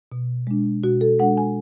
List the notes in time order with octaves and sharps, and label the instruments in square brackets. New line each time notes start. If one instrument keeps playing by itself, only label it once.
[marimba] B2
G#3 D4
B2 F#4
A4
G#3 D4 F#5
G#5